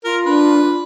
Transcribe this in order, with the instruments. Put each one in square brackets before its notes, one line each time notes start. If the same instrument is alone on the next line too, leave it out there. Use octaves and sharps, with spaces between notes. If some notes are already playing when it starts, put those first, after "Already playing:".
[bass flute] F4 [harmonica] A#4
[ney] D4 [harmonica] B4